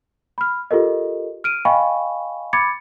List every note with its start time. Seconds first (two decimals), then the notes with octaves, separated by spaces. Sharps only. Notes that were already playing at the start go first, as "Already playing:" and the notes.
0.38 B5 F6
0.71 F4 G4 A4 A#4 D#5
1.44 F6 D7 D#7
1.65 D#5 F5 G5 G#5 B5 C#6
2.53 B5 D6 G#6 A6 C#7